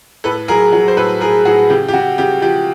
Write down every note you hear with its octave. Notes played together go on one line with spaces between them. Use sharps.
A2 A4 B4
F#3 G#4 A#4
F#3
C5
A2 A4 B4
A2 G#4 A#4
A2 F#4 G#4
C#3 G4
G4
C#3 F#4
C#3 G4
F3 G4